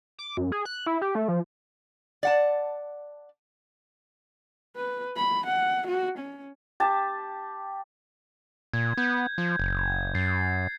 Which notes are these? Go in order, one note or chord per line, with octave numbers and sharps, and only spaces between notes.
D6
F#2
G#4
F#6
E4
G4
A3
F3
D5 F#5 A5
B4
B5
F#5
F#4
C#4
G4 A5
A#2 G#6
B3 G6 G#6
F3
F#1
G#6
F#2 A6 C7